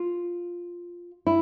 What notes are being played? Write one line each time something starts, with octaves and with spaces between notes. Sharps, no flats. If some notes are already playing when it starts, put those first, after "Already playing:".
Already playing: F4
E4